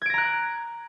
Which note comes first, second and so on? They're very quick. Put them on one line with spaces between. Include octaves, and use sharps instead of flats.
G#6 D7 A#6 A#5 F#6